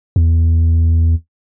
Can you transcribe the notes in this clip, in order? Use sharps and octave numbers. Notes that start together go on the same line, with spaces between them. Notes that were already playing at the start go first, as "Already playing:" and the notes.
E2